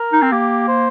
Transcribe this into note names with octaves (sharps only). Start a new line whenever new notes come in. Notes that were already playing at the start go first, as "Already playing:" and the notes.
Already playing: A#4
D#4
C4
A#3 G4
C5